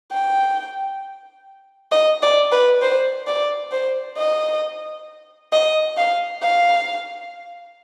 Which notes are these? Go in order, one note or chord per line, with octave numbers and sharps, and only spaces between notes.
G5
D#5
D5
B4
C5
D5
C5
D#5
D#5
F5
F5